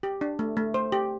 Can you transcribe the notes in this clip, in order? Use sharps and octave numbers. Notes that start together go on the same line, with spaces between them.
G4
D4
A3
A3
C5
G4